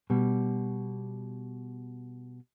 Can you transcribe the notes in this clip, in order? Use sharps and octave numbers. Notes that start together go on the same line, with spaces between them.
B2 G3